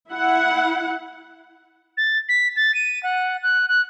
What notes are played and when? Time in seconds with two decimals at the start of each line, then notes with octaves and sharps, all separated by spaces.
0.10 E4 F#5
1.97 A6
2.29 B6
2.56 A6
2.75 D#7
3.03 F#5
3.43 F#6
3.68 F#6